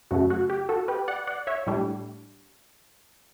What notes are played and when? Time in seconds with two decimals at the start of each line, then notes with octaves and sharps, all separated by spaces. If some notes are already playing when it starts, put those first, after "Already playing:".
0.11 F#2 C#3 F#3 A3 F#4
0.30 F#4
0.50 G4
0.69 F#4 A4
0.88 G4 B4
1.08 D5 F#5
1.27 D5 F#5
1.47 C#5 E5
1.67 A2 G3 D4